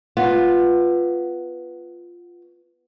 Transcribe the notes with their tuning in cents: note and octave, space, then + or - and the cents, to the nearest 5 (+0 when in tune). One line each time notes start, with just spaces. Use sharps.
B3 +0 F4 +0